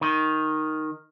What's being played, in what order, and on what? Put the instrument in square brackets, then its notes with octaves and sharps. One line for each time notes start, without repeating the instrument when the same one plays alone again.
[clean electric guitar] D#3